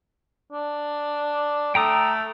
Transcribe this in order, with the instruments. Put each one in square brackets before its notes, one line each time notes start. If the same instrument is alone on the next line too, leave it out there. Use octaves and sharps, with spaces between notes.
[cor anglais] D4
[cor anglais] A3 [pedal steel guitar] G5 A#5 D#6